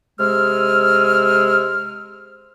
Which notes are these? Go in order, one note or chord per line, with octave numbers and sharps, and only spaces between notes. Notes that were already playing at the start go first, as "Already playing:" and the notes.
C3 G#3 G#4 E6 F6